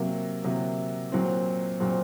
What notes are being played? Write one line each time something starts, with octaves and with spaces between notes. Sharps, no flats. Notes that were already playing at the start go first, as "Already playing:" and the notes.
Already playing: C3 F#3 A#3
C3 F#3 A#3
A#2 F#3 C4
A#2 F#3 C4